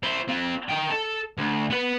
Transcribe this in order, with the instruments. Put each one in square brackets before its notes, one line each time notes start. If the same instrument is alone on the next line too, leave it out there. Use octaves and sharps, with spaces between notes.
[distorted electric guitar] E4 C5
C4 F4
D#4 G5
A4
D2
B3 B4